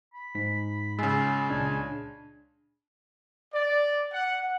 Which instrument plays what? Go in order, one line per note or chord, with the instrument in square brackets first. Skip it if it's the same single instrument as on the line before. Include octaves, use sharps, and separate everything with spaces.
[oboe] B5
[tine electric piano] G#2 B6
[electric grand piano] C#3 G#3 [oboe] F4 [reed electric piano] G#5 B5 E6
[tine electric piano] C#2 A#2 [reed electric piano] D4 A5 [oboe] G#5
[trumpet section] D5
F#5